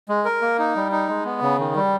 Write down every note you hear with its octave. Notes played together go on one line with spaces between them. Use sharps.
G#3
A#4
A#3
D#4
G3
D#4
G#3
B3
C#3
D#3
G3